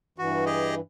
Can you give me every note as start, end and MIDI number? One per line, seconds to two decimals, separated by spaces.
0.18 0.80 43
0.18 0.80 52
0.18 0.45 66
0.46 0.75 67
0.46 0.75 68
0.46 0.75 75